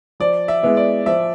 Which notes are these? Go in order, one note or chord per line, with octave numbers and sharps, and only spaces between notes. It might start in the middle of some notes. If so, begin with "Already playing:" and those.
F3 D5
E5
G#3 B3 E4
D5
F3 E5